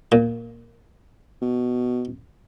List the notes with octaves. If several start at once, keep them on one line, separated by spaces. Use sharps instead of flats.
A#2
B2